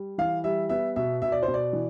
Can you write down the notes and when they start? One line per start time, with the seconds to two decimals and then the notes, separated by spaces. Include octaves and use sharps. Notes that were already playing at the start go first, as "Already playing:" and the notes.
Already playing: G3
0.18 E3 F5
0.44 G3 E5
0.69 B3 E5
0.96 B2 E5
1.22 B2 E5
1.32 D5
1.43 C5
1.48 B2
1.54 D5
1.73 E3